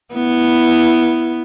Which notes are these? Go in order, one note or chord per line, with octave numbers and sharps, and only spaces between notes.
B3 E4